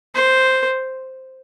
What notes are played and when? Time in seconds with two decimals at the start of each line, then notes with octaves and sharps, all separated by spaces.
0.15 C5